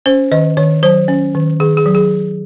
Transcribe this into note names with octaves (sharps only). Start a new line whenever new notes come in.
C#4 C5
D#3 D#5
D#3 C#5
F#3 C5
C#4
D#3
D#3 G#4
G#4
F#3
G#4